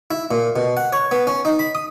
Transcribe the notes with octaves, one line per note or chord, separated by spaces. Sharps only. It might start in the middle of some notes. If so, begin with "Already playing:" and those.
E4
A#2
B2
F#5
C#5
B3
C#4
D#4
B5
D#6